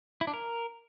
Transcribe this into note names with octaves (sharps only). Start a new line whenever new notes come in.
E4
D4
A#4